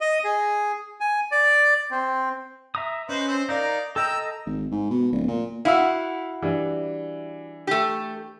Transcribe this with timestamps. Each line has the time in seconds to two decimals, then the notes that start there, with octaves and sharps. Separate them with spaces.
0.01 D#5
0.24 G#4
1.00 G#5
1.31 D5
1.91 C4
2.75 E5 A#5 D#6
3.09 C#4 B4 C5 D#5
3.28 C4 C5
3.49 D#4 A#4 D5 F5
3.96 A4 D#5 G5 A#5 E6
4.46 G#1
4.71 G#2
4.91 B2
5.12 D1
5.28 A#2
5.65 E4 F#4 F5 F#5 E6
6.42 E3 G3 D4
7.67 A3 G4